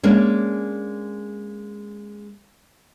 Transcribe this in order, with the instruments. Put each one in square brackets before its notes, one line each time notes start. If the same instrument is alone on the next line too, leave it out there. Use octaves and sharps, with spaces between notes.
[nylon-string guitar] G#3 A#3 C#4 D4